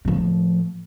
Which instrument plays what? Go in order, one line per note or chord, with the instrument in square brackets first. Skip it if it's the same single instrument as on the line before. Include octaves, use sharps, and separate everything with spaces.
[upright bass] A2 F3